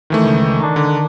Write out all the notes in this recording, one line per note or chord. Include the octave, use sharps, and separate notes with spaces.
D#3 E3 A3
C#2
D#3 D4
D3